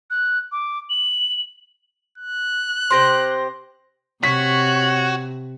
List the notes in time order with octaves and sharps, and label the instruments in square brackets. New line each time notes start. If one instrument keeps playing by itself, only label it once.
[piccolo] F#6
D6
F#7
[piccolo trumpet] F#6
[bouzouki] C3 G4 C5 [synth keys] C6 A#6
[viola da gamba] C3 [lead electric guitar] F#4 [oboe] C#5 [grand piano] B6